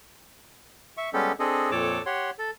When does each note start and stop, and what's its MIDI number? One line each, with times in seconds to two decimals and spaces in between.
0.97 1.10 76
0.97 1.10 85
1.13 1.32 55
1.13 1.32 56
1.13 1.32 59
1.13 1.32 61
1.13 1.32 67
1.13 1.32 69
1.39 1.71 60
1.39 1.71 62
1.39 1.71 68
1.39 1.71 69
1.39 1.71 75
1.71 2.02 41
1.71 2.02 46
1.71 2.02 69
1.71 2.02 73
1.71 2.02 81
1.71 2.02 86
2.06 2.31 67
2.06 2.31 73
2.06 2.31 78
2.06 2.31 84
2.39 2.51 69